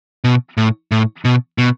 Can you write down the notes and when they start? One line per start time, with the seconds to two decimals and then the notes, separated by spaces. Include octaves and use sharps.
0.24 B2
0.57 A2
0.92 A2
1.25 B2
1.58 B2